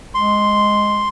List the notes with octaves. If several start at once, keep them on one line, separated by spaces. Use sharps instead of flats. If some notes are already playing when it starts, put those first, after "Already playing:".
G#3 C6